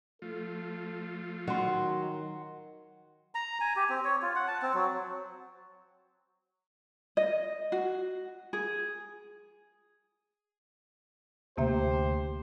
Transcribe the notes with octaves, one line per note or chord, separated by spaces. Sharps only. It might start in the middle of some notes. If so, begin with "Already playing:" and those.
F3 A3 F4 A4
D#3 F#3 F#5 C6
A#5
G#5
G4
C4
C#5
F4
F#5
A5
C4
F#3
D#5
F#4
G#4
D2 C3 A#3 G4 C5 E5